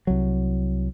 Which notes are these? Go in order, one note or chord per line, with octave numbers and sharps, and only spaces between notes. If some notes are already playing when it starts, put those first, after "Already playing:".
C2 F#3